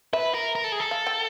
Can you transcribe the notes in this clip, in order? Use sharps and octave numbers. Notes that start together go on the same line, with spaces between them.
B4 E5
A#4
A#4
A4
G#4
A4
F5
G5